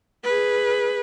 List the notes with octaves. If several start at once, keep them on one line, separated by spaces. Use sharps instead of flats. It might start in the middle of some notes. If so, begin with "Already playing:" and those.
G#4 B4